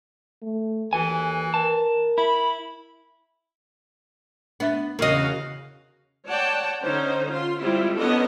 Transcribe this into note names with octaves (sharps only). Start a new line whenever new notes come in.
A3
D#2 E3 F#4 A4 G#5
A#4 A5
E4 B5
B3 D4 E5 A6
E2 C#3 F#4 A#4 D#5 F5
C#5 D5 F#5 G5 A5
D3 C#4 D#4 C5
F4 C6
G3 G#3 C4 E4 F4
D#3 B3 C#4 D4 A4 D#5